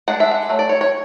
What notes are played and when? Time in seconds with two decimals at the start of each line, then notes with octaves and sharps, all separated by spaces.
0.08 G#3 D4 F#5
0.20 E5
0.31 F#5
0.49 F#3 A3
0.59 D5
0.69 C#5
0.81 C#5